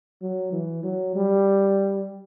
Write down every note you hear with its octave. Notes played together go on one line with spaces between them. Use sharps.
F#3
E3
F#3
G3